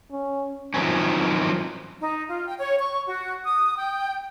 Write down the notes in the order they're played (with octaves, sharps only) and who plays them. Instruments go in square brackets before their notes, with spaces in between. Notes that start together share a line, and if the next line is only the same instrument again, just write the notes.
[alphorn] C#4
[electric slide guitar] D#3 F3 F#3 C4 C#4
[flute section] D#4
F4
G5
C#5
C#6
F#4
D#6
G5